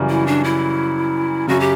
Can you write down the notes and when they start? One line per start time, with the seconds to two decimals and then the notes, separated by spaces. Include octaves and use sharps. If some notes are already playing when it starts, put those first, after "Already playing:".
Already playing: F#2 C#3 E3 G3
0.09 E4
0.27 D4
0.44 E4
1.47 F#2 C#3 F#4
1.60 G4